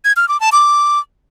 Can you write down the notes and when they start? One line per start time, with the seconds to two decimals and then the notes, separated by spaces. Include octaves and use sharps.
0.05 G#6
0.17 F6
0.28 D6
0.40 A5
0.52 D6